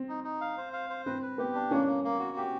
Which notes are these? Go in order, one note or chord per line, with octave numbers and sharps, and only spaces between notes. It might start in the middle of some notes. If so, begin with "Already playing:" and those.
Already playing: C4
D#4
D#4
F5
C5
F5
C5
C4 B4
B4
B3 G4
D4
A#3 C#4
A#3
A#3
F#4
G4